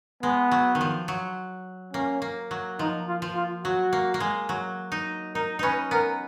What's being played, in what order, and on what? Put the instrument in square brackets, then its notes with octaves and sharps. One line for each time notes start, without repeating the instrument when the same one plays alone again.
[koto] G#3 [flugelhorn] B3
[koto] F#3
D#3
F3
F#3
[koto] A#3 [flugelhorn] C#4
[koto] A#3
F#3
[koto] F3 [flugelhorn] D#4
[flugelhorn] F4
[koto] F3
[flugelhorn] F4
[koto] F#3 [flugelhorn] F#4
[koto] A#3
A#3
G#3
F#3
D#4
[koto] D#4 [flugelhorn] A#4
[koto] C#4 D#4 [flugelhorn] B4
[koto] B3 [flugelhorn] A#4